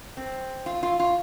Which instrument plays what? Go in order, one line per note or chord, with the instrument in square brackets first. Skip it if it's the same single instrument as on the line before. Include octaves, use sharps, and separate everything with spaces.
[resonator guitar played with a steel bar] C4
F4
F4
F4